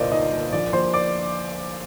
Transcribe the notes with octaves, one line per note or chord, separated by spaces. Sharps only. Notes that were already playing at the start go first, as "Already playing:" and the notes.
Already playing: G1 C2 A#2 C5 D5 D#5
A#2 D#4 D#5
A#2
A#1 D5
A#1 C5 C6
D5 D6